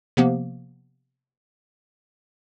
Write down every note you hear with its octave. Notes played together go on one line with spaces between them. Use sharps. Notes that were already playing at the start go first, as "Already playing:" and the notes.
C3 F3 A#3 B3